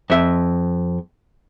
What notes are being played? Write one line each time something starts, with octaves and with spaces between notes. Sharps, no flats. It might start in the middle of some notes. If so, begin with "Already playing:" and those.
F2 E5